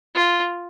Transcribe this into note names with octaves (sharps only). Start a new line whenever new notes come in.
F4